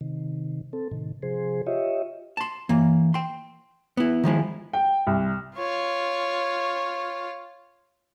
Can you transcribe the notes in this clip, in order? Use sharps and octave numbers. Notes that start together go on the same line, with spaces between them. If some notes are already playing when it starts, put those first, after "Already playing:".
C3 D#3
C4 A4
A2 C3 D#3
C3 F3 G#4 C5
F4 G4 C#5 D#5 E5
A5 C6
E3 A#3
G5 C6
B3 E4
D#3 F3 G#3 E4
G5
C2
F4 C#5